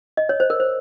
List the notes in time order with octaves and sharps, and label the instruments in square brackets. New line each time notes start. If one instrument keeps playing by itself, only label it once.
[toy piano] D#5
C#5
C5
A#4
C5